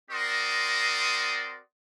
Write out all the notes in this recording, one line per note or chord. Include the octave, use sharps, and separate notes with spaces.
C4 F#4 A#4 D5 C6 D#6